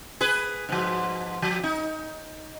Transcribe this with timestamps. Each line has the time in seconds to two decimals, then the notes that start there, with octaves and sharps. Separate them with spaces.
0.21 G#4 B4
0.69 G#2 F3
1.42 F3
1.63 D#4